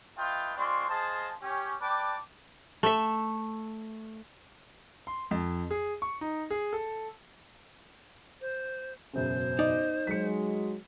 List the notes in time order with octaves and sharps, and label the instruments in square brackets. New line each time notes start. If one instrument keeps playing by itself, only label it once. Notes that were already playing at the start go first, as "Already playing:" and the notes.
[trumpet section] A3 F4 B4 D#5 G5
G#3 C4 F4 D5 C6 C#6
G#4 C5 D#5 F5 A5
C#4 G4
B4 D5 G5 A5 D6
[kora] A3 E5
[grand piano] C6
F2
G#4
C#6
D#4
G#4
A4
[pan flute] C5
[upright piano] E1 F#2 C#3 [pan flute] C5
[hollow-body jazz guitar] D#4 D5
[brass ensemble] F#3 G#3 [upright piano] B6 C#7